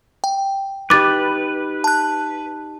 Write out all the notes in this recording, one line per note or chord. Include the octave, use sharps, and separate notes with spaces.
G5
D#4 G4 B4 D6 A6
A5 F#6